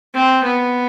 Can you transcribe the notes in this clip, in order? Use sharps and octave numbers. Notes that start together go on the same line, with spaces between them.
C4
B3